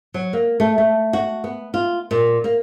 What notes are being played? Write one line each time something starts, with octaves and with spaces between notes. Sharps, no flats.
F#3
A#3
A3
A3
F#4
B3
F4
A#2
A#3